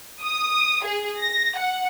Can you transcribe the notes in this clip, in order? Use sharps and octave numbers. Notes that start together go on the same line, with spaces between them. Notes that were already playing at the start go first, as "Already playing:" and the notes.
D#6
G#4
A#6
F#5